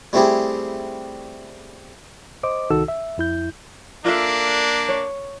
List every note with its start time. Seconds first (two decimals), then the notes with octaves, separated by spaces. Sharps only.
0.13 G3 A3 C4 E4 G4 G#4
2.43 C5 D#5 D6
2.70 C2 D#3 D#4 F#4 A4 E6
2.88 E5
3.18 F2 E4 G6
4.05 A#3 D4 F4 A4 E5
4.89 C#5